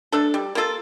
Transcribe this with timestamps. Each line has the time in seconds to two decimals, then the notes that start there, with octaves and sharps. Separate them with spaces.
0.12 A3 D4 A4
0.34 G3
0.55 A#3 F4 A4